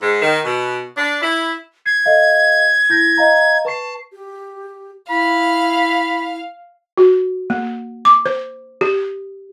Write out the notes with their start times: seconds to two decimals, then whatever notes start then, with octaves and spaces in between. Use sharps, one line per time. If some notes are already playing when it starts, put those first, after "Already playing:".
0.01 G#2
0.21 D#3
0.44 B2
0.96 D4
1.21 E4
1.86 G#6 C7
2.06 A4 D#5 F5
2.90 E4 G6 A#6
3.17 D#5 F5 A#5
3.65 B4 A5 C#6 C7
4.13 G4
5.10 E4 F5 B5
6.97 F#4
7.50 A#3
8.05 D6
8.26 C5
8.81 G4